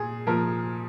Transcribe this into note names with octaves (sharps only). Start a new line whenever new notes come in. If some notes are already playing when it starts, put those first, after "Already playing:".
Already playing: A#2 G#4
A#2 F3 A#4